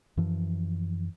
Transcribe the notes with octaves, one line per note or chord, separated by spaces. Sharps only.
F#2 E3 F3